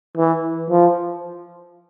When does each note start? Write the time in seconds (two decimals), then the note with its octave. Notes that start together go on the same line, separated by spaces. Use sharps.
0.17 E3
0.70 F3